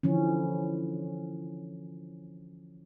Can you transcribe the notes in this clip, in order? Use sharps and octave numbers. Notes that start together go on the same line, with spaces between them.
D3 E3 F3 C#4